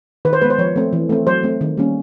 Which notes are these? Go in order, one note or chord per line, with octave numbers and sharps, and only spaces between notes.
D#3 B4
C5
G#3 B3 B4
C5
F3 C#5
A3 C4
E3
A3 C4
F#3 C5
A3 C4
D#3
G3 A#3 C#4